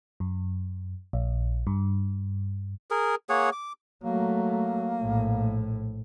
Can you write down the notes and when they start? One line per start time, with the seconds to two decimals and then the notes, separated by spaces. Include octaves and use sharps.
0.20 F#2
1.13 A#1
1.67 G2
2.91 G#4 A#4
3.29 A#3 G#4 C#5 F#5
3.52 D6
4.04 F#3 A3 A#3
5.02 A#1 A2